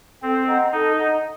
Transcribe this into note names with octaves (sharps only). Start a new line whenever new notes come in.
C4 A4
D#5 F#5 A#5
D#4 A4
D#5 F#5 A#5